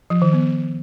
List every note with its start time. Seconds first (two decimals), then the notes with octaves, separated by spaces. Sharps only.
0.10 F3
0.22 D#3
0.33 B3